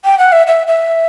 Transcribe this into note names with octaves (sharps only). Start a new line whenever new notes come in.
G5
F#5
E5
E5
E5